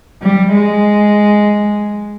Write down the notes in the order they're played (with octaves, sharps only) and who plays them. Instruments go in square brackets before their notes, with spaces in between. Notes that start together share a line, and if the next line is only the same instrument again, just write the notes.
[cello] G3
G#3